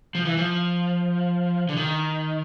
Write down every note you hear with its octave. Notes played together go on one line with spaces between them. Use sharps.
F3
E3
F3
D3
D#3